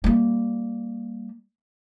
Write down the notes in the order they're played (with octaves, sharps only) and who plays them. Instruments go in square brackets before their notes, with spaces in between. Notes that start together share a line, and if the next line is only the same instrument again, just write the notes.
[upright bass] G3 A#3